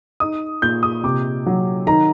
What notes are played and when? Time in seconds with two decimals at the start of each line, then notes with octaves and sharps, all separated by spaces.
0.20 D#4 D#6
0.62 A#2 G6
0.83 D#6
1.04 C3 D6
1.46 F#3
1.87 D#3 A#5